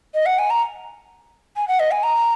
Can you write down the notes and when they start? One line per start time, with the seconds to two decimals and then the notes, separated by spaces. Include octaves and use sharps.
0.15 D#5
0.26 F#5
0.39 G#5
0.50 A#5
1.57 G#5
1.68 F#5
1.80 D#5
1.91 G#5
2.03 A#5